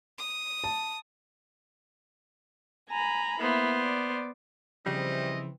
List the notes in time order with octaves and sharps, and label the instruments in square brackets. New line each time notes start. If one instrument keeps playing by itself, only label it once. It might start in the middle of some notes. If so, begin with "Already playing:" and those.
[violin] D#6
[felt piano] A5
[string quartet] G#5 A#5 B5
[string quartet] A#3 E4 [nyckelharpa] B3 C5
[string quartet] D5
[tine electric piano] C#3 F3 [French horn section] E3 C4 [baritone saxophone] G3 [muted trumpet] D#5